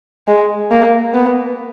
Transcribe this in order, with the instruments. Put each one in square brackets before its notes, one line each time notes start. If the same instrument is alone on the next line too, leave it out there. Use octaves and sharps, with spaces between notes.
[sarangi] G#3
A#3
B3